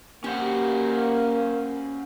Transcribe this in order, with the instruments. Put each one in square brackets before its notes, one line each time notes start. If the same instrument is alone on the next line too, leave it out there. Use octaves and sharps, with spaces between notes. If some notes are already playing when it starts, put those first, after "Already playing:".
[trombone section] A#3 [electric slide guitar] C#4 C5 F#5 [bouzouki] G4